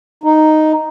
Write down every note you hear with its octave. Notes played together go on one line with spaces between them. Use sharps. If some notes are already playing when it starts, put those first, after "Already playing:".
D#4